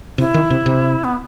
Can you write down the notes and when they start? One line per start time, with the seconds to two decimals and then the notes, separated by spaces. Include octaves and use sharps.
0.18 C3 E4
0.34 D#3
0.50 C3
0.66 C3
1.04 B3